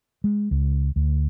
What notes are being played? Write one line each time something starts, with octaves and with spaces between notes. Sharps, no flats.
G#3
C#2
D2